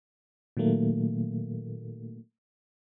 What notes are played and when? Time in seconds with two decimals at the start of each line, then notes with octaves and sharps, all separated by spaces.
0.57 A#2 D#3 F#3 A3 A#3